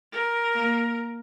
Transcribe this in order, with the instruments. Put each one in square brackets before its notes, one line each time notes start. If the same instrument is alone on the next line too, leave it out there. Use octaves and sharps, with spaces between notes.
[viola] A#4
[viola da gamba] A#3